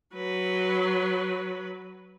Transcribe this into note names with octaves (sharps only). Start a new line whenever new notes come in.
F#3 B4